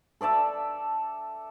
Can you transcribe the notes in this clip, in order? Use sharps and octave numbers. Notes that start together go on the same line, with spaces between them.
A4 D5 E5 A5